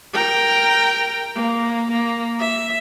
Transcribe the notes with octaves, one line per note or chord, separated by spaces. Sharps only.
A#4 G5
A#3
A#3
E5